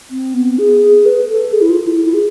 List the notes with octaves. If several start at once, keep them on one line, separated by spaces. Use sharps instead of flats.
C4
B3
G#4
G#4
B4
A4
G#4
E4
F4
E4
E4
G#4